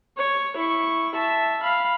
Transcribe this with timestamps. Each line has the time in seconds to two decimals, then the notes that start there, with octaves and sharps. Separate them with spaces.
0.17 C#5
0.56 E4 C#6
1.15 E5 A5
1.62 F5 B5